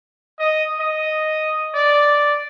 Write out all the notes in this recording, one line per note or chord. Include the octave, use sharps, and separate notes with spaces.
D#5
D#5
D5